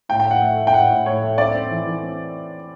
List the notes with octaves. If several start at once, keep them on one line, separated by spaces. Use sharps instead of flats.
A2 G5
G5
A2
F#5
A3
A3
G5
A2 F#5
A2
A2 C#5
A3
C4 D5
C4
E3
E3
C4